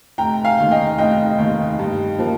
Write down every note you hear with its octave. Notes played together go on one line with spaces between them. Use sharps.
F1 G5 A#5
F5 G#5
D#2 D#3
D#5 G5
F1 D#5 G5
D#2 D#3
G2
F3 A#3